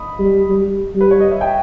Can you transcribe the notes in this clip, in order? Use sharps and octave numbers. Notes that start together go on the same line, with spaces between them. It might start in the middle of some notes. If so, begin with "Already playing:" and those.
Already playing: D#5 B5 D#6
G3
G3
G3
B4
C#5
D#5
E5
G5